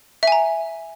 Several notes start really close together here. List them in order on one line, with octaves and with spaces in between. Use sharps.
E5 G#5 A#5